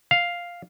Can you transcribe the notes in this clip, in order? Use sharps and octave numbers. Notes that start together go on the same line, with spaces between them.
F5